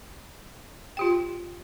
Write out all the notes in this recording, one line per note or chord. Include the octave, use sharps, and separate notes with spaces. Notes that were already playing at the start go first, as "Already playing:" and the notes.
F4 G4 G5